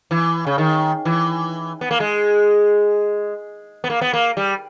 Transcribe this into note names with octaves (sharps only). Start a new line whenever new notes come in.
E3
C#3
D#3
E3
B3
A#3
G#3
B3
A#3
B3
A#3
G3